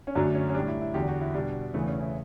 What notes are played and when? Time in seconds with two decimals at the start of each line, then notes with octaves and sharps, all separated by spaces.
0.07 C#4
0.15 F#2 D3 F#3 A3 D4
0.34 C#4
0.49 C#4
0.54 G3 D4
0.60 A2
0.68 E4
0.81 E4
0.94 E2 D3 F#3 G4
1.08 F#4
1.21 E4
1.34 B2 G3 D4
1.74 E2 C#3 E3 A3 B3
1.88 C#4
2.01 E4